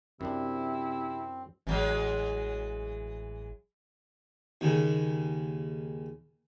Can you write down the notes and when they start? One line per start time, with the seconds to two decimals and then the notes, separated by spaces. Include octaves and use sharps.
0.21 F#2 C3 C4 D4 E4
1.67 A1 E3 F#3 G#3
4.61 D#2 C#3